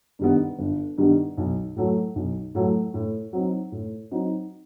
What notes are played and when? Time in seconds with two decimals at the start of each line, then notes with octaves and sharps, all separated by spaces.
0.19 G2 D#3 G3 B3
0.59 G1
0.98 G2 D#3 G3 B3
1.37 B1
1.76 A2 F#3 A3
2.16 B1
2.55 A2 F#3 A3
2.94 A2
3.33 F#3 C4 D#4
3.72 A2
4.11 F#3 C4 D#4